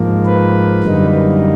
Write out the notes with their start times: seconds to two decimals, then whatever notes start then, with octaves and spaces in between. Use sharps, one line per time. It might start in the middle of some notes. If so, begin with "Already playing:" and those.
Already playing: G#2 F3 A#3
0.25 B4
0.83 F#2 D3 G3 A#3 D#4